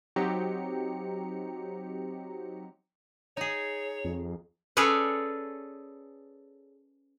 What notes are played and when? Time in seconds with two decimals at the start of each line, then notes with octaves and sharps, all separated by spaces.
0.16 F#3 C4 D#4 G4 A#5 C#7
3.37 D#4 G#4 C#5
4.05 F2
4.77 C#4 G#4 A4 B4 C#5 D5